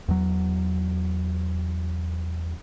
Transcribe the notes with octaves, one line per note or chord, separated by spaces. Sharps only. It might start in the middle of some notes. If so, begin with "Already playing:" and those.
E2 F#3